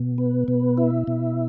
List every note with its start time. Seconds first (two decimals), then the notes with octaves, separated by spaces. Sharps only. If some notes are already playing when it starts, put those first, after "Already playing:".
Already playing: B2
0.18 B3
0.48 B2
0.78 E4
1.08 B2